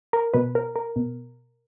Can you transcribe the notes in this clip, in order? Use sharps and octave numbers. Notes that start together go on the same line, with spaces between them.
A#4
B2 B4
A#4
A#4
B2